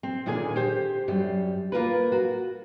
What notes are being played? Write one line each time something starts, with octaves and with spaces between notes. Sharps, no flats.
C4
D#2 A#2 D3 G#4 A4 G#5
G4 C5
F#2 G3
A#3 F4 A#4 B4
F#4